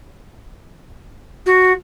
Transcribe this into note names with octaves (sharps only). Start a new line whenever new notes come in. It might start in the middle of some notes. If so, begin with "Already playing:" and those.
F#4